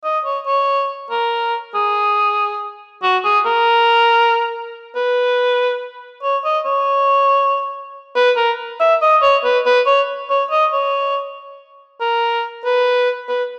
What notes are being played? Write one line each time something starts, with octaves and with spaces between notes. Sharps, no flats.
D#5
C#5
C#5
A#4
G#4
F#4
G#4
A#4
B4
C#5
D#5
C#5
B4
A#4
E5
D#5
C#5
B4
B4
C#5
C#5
D#5
C#5
A#4
B4
B4